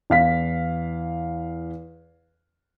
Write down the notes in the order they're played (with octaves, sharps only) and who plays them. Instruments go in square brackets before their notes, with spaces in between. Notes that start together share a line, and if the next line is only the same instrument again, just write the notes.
[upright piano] E2 F5 B6